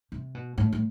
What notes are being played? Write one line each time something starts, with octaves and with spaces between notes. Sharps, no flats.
C3
B2
A2
A2